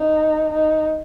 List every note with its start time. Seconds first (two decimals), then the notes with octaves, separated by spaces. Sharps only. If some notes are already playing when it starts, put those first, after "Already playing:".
Already playing: D#4
0.52 D#4